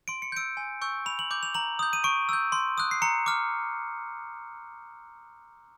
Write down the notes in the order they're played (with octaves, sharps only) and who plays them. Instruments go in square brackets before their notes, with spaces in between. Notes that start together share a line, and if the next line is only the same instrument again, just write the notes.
[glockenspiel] C6 D7
C#7
E6 G6 D7
G#5
C#6 E6 G6
B5 F7
F#7
D6 G6
F7
A#5 F#7
D#6 G6
D#7
C#6 D7
E6 G6
C6
D#6 F#6
C7
A#5 C#7
D6 F6